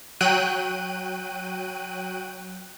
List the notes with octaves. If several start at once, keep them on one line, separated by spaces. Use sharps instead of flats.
F#3 G5 F#6 D#7